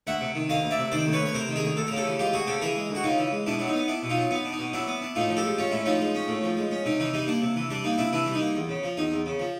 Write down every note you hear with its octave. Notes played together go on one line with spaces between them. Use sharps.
D2 E5 F#5
C3
D#3
D2 D#5 F5
D2
D5 E5
C3
D#3 C5 D5
D2
B4 C#5
D2
C#5
C3 A#4 C5
D#3
G#4 A#4
D2
D2 A4
C#3 A#4
G4 A4
E3
G#3 F4 G4
D2 F#4 G#4
C#3 G4 A4
E3 G#4 A#4
G#3
D2
F#4
C#3 D#4 F4
E3
G#3
B2 D4 E4
F#3 D4
D#4
B3
D4 E4
B2
D#4 F4
F#3
B3 D#4
D4
D#4
B2
F#3 D4 E4
B3
D4
A2 D#4 F4
F3
G4 A4
G#3
C#4 F4
A2 E4
F3 D#4 F4
G#3
C#4
A2
F3
G#3
C#4
C3 D#4
E3 D#4
G3 D#4
A#3 D4
C3
E3
G3 D4
A#3 D#4
C3 D4 E4
E3 D4 E4
G3
D#4
A#3
E2
C#3
F3
E2 D#4
E2
C#3
F3